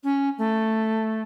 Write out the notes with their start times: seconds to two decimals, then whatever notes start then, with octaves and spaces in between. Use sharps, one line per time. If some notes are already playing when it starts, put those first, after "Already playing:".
0.04 C#4
0.38 A3